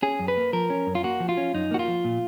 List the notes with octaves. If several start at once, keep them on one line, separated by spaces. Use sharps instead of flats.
C#4 G#4
F#2
B4
A#3
F3 A#4
C#4
F#2
F4
A#3 F#4
F3
F4
C#4
F#2 D#4
A#3 F#4
F4
F3
A#2